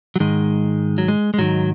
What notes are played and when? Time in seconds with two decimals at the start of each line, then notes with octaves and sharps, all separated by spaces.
0.16 F#3
0.20 G#2 D#3 G#3
0.98 F#3
1.08 G#3
1.34 G#3
1.38 G#2 D#3 F#3